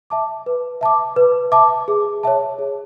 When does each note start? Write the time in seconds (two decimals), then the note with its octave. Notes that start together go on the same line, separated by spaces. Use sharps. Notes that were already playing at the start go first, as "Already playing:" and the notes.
0.10 E5 A5 D6
0.46 B4
0.81 E5 A5 D6
1.16 B4
1.52 E5 A5 D6
1.88 G#4
2.23 C#5 E5 A5
2.59 G#4